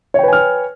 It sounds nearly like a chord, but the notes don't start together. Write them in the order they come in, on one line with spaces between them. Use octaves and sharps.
C#5 G5 B4 G#5 F6